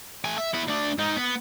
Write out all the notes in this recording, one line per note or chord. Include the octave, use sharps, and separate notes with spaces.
A3 G#5
E5
B3 E4
D2 D4
G#2 D#4
B3